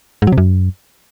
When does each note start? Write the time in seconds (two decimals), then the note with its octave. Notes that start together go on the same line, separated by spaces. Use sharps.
0.22 G#2
0.27 F#3
0.32 C3
0.38 F#2